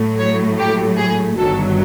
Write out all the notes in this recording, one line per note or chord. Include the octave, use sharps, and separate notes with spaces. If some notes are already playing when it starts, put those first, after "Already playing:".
Already playing: A2 F#3 A3
C#5
G4
G#4
G1 G2 D#3 F#3 A4